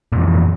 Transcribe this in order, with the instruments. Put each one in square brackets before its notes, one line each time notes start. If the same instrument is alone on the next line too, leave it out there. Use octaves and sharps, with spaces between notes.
[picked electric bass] A#2
F2
E3